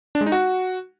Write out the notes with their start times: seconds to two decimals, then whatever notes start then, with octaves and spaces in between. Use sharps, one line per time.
0.15 D4
0.21 G#3
0.26 D#4
0.32 F#4